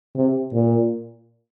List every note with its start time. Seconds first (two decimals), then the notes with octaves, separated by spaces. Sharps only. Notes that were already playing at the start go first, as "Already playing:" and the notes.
0.15 C3
0.53 A#2